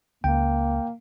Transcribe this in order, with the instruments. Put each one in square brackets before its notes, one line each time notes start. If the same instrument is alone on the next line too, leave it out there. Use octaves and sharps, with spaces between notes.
[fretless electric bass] C#2 [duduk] A#3 [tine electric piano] G5